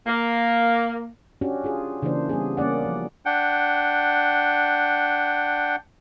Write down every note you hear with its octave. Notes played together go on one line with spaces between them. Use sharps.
A#3
C#4 D4 F#4 G4
F4 G#4
C#3 E3 A#3 D4 C5
G3 B3 G#4
A#3 C#4 D5 F#5
F3
D4 F#5 G5